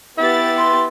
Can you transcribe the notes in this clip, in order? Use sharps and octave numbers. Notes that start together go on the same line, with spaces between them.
B3 E4 G4 A6
C6